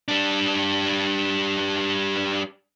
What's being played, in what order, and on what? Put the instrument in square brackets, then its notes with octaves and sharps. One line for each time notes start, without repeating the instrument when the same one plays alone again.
[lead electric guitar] G3 D4